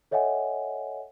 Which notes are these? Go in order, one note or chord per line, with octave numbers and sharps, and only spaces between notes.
A4 C#5 D#5 E5 F#5 G#5